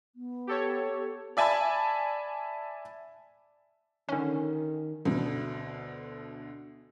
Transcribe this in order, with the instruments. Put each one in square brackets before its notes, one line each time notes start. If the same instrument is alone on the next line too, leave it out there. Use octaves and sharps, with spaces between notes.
[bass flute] B3
[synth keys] G4 A4 C#5
[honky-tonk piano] D5 E5 G#5 A5 B5
[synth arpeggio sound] D3 C#4 [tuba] D#3
[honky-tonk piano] D2 B2 D3